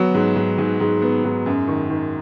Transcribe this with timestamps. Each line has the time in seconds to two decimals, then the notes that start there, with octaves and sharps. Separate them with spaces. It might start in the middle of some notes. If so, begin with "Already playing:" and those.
Already playing: F#3 B3 F#4
0.14 G#2
0.36 G#2
0.58 G#2
0.80 G#2
1.02 B3
1.24 G#2
1.46 F#2
1.67 D#3
1.89 D#3